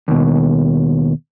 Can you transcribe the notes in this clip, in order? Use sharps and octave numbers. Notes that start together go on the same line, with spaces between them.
D#2 B2